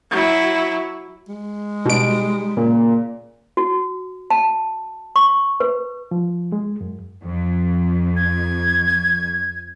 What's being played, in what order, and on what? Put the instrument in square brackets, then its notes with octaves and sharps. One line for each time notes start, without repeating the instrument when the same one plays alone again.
[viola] F#3 E4
[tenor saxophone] G#3
[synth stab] B2 D7 [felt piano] G3 D#4
[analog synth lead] A#2 [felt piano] C#3
[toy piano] F#4
A5
C#6
B4
[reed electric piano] F3
G#3
F#2
[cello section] F2
[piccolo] G#6